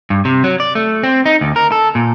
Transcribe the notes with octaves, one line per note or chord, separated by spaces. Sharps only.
G2
C3
F#3
D5
A3
C4
D#4
D2
A#4
A4
A#2